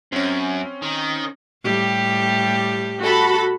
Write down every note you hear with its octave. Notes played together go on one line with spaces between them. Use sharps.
F#2 C4 C#4
D#3
A2 G3 G4
F#4 A4 B5